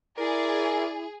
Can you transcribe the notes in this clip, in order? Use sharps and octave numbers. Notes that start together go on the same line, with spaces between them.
E4 G#4 A#4 D5